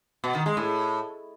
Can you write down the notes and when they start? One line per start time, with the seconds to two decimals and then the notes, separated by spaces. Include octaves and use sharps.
0.24 B2
0.35 D#3
0.46 G#3
0.57 A2